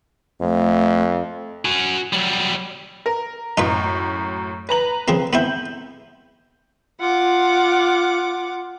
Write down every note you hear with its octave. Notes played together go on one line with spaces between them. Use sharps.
F2 A3
F#4 G#5
F#3 G3
A#4
F#2 A2 D#4 F4 B4
B4 A#5 F#7
C#3 F3 C4
B3 C4 E4 G6 F#7
F4 F#5 D6